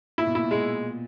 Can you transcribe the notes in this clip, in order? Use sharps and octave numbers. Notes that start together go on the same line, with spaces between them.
A#2 E4
B2
A#2 E4
B2
A#2 G#3